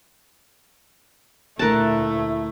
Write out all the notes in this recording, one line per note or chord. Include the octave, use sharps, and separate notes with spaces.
D2 A#2 A3 E4 A#4 F#5 A5